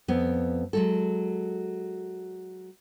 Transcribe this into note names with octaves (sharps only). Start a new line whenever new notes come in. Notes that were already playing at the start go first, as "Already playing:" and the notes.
F2 B3
F#3 G#3 A4